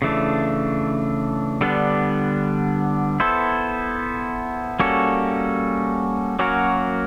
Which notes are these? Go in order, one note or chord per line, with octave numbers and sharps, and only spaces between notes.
C#3 E3 A3 D4
D3 G3 B3 D4
B3 E4 A4 C5
G3 A#3 C#4 F#4 A4
F#3 A#3 C#4 F#4 A#4